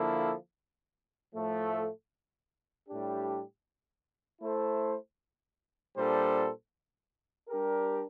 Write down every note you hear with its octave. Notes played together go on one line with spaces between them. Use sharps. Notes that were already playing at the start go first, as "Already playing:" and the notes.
Already playing: D3 F3 A#3 E4 A4
A2 F3 A3
A2 G3 D4 G4
A3 E4 A4 C5
A#2 G3 D4 A4 C5
G3 D4 G4 A#4